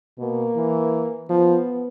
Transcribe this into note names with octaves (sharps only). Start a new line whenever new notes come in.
B2 A#3
E3
F3 B3